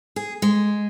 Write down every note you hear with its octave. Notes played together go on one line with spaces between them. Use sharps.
G#4
G#3